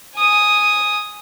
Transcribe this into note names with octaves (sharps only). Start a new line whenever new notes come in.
G#5 D#6